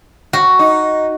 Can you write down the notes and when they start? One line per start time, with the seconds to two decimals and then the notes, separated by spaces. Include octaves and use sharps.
0.33 F#4
0.59 D#4